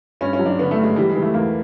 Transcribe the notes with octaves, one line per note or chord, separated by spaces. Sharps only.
G2 C#4
C#4
F#3
D4
D3 B3
A3
G2
G#3
E3 G3
G#3
E3
A3
E2 A#3